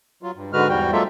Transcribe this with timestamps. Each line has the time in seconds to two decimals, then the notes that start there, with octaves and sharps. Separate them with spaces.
0.23 F#3 F4
0.35 G2
0.53 G#2 D3 G#3 F#4 B4 F6
0.69 E2 G#2 G3 F#4 G5
0.92 F#3 G#3 A#3 F4 A4 E5